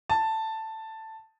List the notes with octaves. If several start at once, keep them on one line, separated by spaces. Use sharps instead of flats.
A5